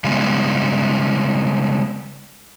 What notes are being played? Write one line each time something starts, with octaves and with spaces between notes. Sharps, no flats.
C#3 G3 G#3 B3